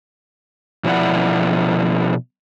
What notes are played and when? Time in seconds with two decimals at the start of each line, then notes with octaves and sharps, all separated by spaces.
0.84 B2 F3 E4 D5 E5 F#5